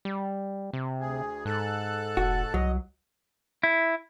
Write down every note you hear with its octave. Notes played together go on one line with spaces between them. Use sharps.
G3
C3
D2 G#4
G#2 A4 A5 F#6
E1 F#4
C2 F#3 D#5
E4